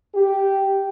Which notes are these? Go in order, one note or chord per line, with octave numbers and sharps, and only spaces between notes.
G4